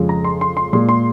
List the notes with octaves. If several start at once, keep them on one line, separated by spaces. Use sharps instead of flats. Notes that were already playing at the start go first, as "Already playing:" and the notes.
Already playing: F2 C#3 F3 G#3
A#5
C6
C6
C6
A#2 G#3 C6
C6